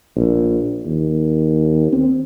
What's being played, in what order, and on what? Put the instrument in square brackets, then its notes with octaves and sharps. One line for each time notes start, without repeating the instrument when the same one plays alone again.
[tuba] A#1
D#2
C4